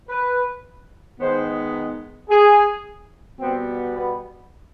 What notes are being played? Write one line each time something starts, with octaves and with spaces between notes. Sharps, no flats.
B4
D#3 G#3 B3 C5
G#4
B2 G3 B3 C4
B3